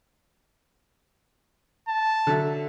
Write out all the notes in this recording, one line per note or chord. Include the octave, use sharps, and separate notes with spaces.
A5
D3 F#3 E5